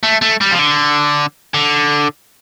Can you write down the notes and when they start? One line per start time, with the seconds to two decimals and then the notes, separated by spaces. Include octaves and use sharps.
0.03 A3
0.22 A3
0.41 G3
0.51 F3
0.59 D3
1.54 D3